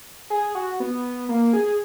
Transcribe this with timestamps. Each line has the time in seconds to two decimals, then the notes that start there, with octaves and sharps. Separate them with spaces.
0.30 G#4
0.55 F#4
0.80 B3
1.29 A#3
1.53 G#4